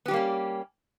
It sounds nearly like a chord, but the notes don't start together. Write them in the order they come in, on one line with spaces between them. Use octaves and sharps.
B3 G4 G3 A#3 C#4